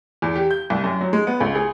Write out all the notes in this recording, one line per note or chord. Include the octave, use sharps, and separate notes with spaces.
E2
G4
G6
C2
F#2
F#3
G#3
B3
C#2
G#4